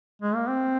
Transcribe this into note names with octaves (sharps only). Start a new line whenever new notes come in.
G#3
A#3
C4